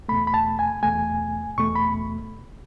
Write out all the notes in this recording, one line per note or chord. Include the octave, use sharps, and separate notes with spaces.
E2 B2 A3 B5
B5
A5
G#5
E2 B2 A3 G#5
E2 B2 A3 C#6
B5